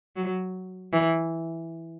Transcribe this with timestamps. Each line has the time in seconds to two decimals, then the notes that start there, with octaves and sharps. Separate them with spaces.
0.16 F#3
0.93 E3